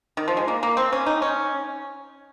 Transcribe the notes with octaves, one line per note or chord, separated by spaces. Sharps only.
D#3
F3
G#3
A#3
A#3
C4
C#4
D#4
C#4